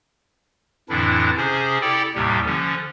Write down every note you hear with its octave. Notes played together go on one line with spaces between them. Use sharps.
F2 A2 D3 E3 D4 E4
C3 C#4 G#4 C5
E4 G4 A4 D5 G5
D#2 A2 C3 G3 G4
D3 F3 C#4